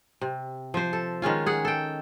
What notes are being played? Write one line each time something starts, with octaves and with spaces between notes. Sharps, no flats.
C3
F3 C5
A4
D#3 G#3 C#4 F4
G#4 F#5
A4 G5